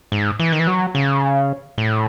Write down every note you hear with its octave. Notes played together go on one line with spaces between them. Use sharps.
G#2
E3
D#3
E3
F#3
C#3
A2